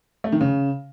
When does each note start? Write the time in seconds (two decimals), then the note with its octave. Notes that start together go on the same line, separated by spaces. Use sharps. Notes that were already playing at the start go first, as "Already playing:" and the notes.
0.24 A3
0.32 D#3
0.41 C#3